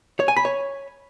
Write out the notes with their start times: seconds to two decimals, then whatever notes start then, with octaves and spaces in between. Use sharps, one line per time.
0.20 C#5
0.28 G#5
0.37 B5
0.45 C#5